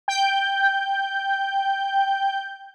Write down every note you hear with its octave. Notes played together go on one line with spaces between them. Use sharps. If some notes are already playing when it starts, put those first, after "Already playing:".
G5 G6